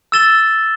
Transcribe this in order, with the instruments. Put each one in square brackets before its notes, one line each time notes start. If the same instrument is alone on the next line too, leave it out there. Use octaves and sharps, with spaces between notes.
[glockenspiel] E6 A6 E7 G7